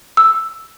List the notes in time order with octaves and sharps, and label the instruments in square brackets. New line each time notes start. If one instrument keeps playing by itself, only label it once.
[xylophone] E6